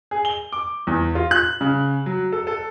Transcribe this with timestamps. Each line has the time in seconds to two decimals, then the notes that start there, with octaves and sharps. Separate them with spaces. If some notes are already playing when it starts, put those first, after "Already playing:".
0.11 G#4
0.25 G7
0.52 D6
0.87 E2
1.15 F4
1.31 F#6
1.61 C#3
2.06 F#3
2.32 A4
2.47 A4